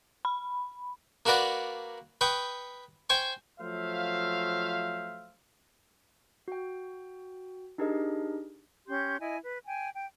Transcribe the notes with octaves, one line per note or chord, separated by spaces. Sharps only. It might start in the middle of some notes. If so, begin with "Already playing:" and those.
B5
A#3 F#4 A#4 B4 D5 F#5
B4 G5 C#6 D#6
C5 G5 G#5 C#6
F3 F#3 A3 C5 E5 F5
F#4 G5
D4 D#4 G4 G#4 A#4 D#5
C#4 G4 C6 G6
E4 D#5 G#5
B4
G5 G#5
G5